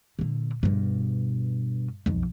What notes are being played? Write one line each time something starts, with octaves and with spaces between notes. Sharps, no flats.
A#2 D3
G2 B2
B1 F2